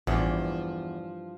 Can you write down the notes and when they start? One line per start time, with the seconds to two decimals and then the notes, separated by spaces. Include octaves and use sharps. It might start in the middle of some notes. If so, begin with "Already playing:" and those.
0.07 A1 E2 G2 E3 F3 D5